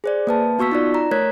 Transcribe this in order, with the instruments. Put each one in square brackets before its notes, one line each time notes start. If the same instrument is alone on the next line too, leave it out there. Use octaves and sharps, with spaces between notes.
[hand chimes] G#4 C5 D5
A#3 B4 A5
B3 F#4 C#6 E6 B6
D#4 F4 D5
A#5
A3 A#4 C#5 F#6 G#6 B6